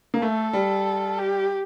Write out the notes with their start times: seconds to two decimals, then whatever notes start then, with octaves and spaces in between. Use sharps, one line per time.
0.14 A#3
0.22 A3 A4
0.53 G3
1.19 G4